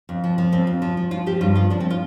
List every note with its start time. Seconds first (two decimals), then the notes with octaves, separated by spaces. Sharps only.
0.09 F2
0.24 F3
0.38 F3
0.52 F2 C4
0.67 F2
0.82 F3
0.97 F3
1.11 F3 F4
1.26 F3 G4
1.41 G2 F4
1.55 F3 F4
1.70 F3 D4
1.80 C4
1.90 F4